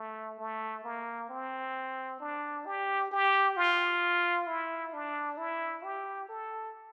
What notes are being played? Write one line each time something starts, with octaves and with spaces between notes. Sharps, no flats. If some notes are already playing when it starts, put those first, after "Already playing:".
Already playing: A3
A3
A#3
C4
D4
G4
G4
F4
E4
D4
E4
G4
A4